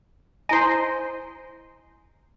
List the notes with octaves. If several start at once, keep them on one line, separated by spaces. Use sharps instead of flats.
E4 C5 D#5 G#5